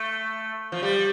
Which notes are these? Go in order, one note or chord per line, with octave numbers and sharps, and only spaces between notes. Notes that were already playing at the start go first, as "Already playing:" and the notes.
Already playing: A3
F3
G3